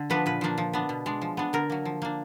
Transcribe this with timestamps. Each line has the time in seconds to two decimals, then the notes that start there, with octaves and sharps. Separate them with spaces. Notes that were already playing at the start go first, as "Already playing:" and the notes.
Already playing: D3
0.10 F3 B3 D4 B4
0.26 A#2 B4
0.41 F3 A#3 D4
0.58 F3
0.73 B3 D4
0.89 B2
1.06 G#3 D4
1.21 F3
1.37 B3 D4
1.53 D3 A#4
1.70 F#3 A#3
1.85 F3
2.02 A#3 D4